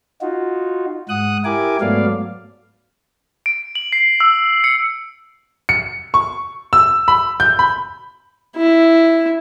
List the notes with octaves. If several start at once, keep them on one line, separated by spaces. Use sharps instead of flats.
D#4 F4 F#4
G#2 F#5 D#6 F#6
E4 G4 A#4 G#5 D6
G#2 F#3 A3 B3 D5 F5
D7
F#7
C7
E6
C#7
C#7
C#6
E6
B5
G6
B5
E4